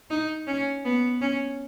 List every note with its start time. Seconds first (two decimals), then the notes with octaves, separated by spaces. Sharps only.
0.11 D#4
0.47 C#4
0.85 B3
1.21 C#4